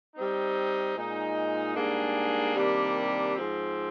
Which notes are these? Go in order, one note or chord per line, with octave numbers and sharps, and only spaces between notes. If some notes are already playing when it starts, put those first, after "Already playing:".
G3 C4 D#4
A#2 G#3 D#4
G#2 G3 A#3 D4 G#4
C3 D#3 G3 A#3 D4
G#2 F3 C4